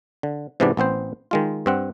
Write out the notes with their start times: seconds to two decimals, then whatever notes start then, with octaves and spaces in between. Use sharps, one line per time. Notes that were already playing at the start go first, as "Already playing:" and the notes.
0.23 D3
0.60 G#2 C3 E3 B3 D4 D5
0.77 A1 B3 C4 C5
1.31 D#3 G#3 F4
1.66 G2 C4 F#5